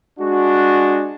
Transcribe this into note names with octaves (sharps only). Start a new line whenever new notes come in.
G#3 D4 F#4